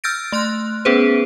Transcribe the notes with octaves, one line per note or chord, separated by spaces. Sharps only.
E6 F6 G6 A6 A#6 D7
A3 C6 F6 F#6
B3 C#4 G#4 B4 C5